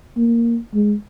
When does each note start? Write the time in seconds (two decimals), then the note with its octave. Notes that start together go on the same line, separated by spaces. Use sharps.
0.17 A#3
0.74 G#3